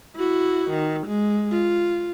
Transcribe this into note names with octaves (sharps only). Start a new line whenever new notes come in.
E4 F#4
D#3
G#3
F4